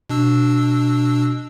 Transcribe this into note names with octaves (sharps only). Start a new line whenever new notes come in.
B2 D4 E6